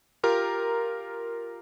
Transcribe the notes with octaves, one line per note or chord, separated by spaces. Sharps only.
F4 G4 A#4 A#5